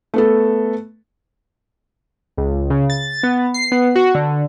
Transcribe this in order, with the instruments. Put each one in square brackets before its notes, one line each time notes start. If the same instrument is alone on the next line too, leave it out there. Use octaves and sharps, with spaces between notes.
[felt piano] A3 B3 A4
[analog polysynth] C#2
C#3
A6
B3
C7
B3
F#4
D3